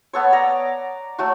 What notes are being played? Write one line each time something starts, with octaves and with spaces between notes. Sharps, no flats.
B3 A4 C#5
D5 A#5
F#3 A3 F#4